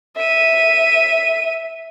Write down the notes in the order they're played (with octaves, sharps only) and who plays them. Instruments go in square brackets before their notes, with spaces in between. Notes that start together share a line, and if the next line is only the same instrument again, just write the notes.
[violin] E5 D#7